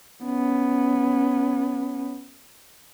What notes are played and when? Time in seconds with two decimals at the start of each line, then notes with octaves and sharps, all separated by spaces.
0.24 B3 C#4